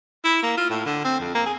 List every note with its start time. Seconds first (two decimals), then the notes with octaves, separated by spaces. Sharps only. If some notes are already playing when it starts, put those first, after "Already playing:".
0.24 E4
0.42 A#3
0.57 F4
0.70 A2
0.85 D3
1.04 C4
1.20 F2
1.34 A#3
1.46 G#4